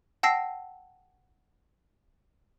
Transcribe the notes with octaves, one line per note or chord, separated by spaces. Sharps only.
F#5 G5 A5 E6 A#6 C7